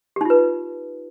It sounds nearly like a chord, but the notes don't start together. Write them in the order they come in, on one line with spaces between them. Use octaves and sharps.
G4 D#4 F4 B4